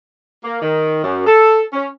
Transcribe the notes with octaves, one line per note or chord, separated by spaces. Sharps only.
A#3
D#3
F#2
A4
C#4